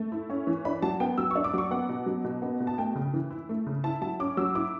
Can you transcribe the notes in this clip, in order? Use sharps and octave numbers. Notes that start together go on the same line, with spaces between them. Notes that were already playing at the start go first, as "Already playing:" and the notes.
Already playing: A3
E4
C#4
E3
D4 B5
F#3 A5
B3 G5
F#3 E6
C#6
D4
D6
F#3 C#6
B3 F#5
B2
F#3
B2
B3
B2
A5
A3 G5
C#3
E3
E4
A3
C#3
E4 A5
F#3 A5
C#4 D6
F#3 E6
E4 D6